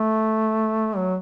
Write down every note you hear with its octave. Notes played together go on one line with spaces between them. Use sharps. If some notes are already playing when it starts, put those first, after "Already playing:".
Already playing: A3
F#3